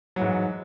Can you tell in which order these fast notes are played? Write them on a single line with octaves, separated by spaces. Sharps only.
F#3 E3 G#2